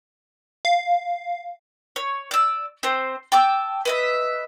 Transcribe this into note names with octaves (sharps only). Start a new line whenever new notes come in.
F5
C#5
D5 E6
C4 C5
G5 A5 D6 E6
B4 D#5 E5